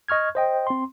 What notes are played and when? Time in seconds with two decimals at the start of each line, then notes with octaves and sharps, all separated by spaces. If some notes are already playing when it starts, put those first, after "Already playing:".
0.08 D#5 C#6 F6 G#6
0.35 C5 D#5 G5
0.67 C4 C6